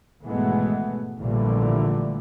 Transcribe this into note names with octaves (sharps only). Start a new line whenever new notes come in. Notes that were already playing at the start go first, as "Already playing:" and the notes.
G#1 B2 E3 G#3 A3 B3
A#1 A#2 D3 E3 G3 A3